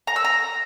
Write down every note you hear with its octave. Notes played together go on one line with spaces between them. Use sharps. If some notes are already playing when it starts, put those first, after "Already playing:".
A#5
E6
A#5